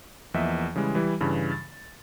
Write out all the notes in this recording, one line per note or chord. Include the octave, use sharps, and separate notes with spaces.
E2 F3 A#3 D#5 E5
C#3 E3 G3 G#3
E3 G3 E4
G2 C#3 E3
A6